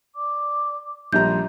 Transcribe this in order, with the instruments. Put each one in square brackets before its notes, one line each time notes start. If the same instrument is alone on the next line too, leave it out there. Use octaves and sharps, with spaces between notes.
[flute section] D5 D6
[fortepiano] A#1 G3 A#5 [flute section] C6 [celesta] G6